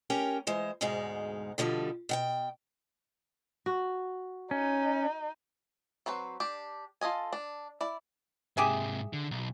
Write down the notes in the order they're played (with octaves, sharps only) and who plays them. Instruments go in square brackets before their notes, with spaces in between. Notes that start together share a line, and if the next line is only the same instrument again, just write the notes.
[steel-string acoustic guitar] C#4 G4 A#4 G5
E3 G#3 C5
D2 G#2 B2 G#3 D#4 F5
B2 D3 F3 G3
B2 F#5 G5
[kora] F#4
[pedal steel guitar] C#4 [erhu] D#4
[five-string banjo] F#3 C4 B4 C5
D4 G4
F4 A4 D#5 G#5
D4
E4 D5
[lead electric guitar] G#2 C3 [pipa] G4 G#4 E5
[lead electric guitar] D3
B1